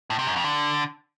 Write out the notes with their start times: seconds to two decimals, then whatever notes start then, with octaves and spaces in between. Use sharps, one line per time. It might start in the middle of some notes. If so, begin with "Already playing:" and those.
0.10 A2
0.19 C3
0.27 F#2
0.36 F2
0.44 D3